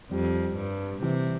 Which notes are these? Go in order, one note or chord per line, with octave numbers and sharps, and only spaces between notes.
F2 G3
G2
C3 E3